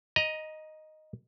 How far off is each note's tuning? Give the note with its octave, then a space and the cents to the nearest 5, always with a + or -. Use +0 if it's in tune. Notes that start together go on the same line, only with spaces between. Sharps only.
D#5 +0 A#5 +20